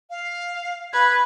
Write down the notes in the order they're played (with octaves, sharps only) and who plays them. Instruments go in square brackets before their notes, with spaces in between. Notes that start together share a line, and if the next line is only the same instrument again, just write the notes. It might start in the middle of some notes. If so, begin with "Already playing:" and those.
[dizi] F5
[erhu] B4 [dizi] G#6